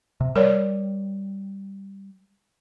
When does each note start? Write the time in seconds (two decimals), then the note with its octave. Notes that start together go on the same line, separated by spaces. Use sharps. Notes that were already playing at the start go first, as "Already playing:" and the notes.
0.21 C3
0.36 G3 A#4 C#5 D5